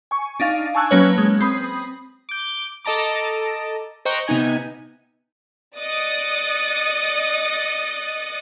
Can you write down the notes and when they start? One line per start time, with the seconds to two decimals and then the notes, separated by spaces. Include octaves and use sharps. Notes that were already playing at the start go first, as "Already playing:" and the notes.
0.11 G#5 C#6
0.40 D4 D#4 F5 A6
0.75 G#5 A5 C#6 E6 F#6 G#6
0.91 F#3 A#3 C#4 B4 C#5
1.18 G#3
1.41 C4 B5 D#6
2.29 D6 G6
2.85 A4 D#5 A5 A#5 D6
4.05 C5 D#5 G5 A#5 C#6 F#6
4.28 C3 B3 D#4 G#5
5.78 D5 D#5 D#6 F#6 A6 C#7